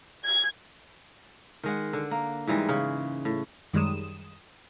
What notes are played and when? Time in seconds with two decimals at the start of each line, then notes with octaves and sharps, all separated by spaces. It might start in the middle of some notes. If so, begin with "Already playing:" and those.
0.25 G#6
1.63 D#3 G#3 F#5
1.93 D3
2.11 A#3
2.47 G#2 E3 G3 G#3
2.69 C#3
3.25 A2
3.73 F#2 D#3 G3 G#3 D#6 E7